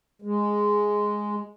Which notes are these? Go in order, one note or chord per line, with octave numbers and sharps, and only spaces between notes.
G#3